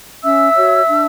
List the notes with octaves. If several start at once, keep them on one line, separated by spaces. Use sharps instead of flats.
C#4 E5 E6
F#4 C#5
D4